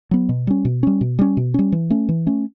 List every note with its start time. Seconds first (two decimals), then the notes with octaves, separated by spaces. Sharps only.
0.11 F#3 B3
0.29 B2
0.47 G3 C#4
0.65 B2
0.83 G3 C#4
1.01 B2
1.19 G3 C#4
1.37 B2
1.54 G3 C#4
1.72 E3
1.90 A3 C#4
2.09 E3
2.27 A3 C#4